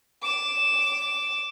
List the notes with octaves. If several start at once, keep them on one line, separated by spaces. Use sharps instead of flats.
D6 E7